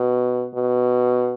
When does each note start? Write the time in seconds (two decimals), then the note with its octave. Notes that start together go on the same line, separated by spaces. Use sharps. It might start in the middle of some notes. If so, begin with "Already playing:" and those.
Already playing: B2
0.55 B2